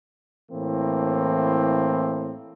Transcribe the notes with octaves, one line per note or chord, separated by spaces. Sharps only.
A2 E3 A#3 C4